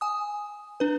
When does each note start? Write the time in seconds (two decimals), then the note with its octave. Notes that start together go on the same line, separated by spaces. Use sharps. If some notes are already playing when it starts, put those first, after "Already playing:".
0.01 G#5 D#6
0.80 D4 B4